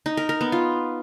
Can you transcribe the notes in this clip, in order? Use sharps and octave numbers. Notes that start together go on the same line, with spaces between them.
D#4
A#4
A#4
B3
F4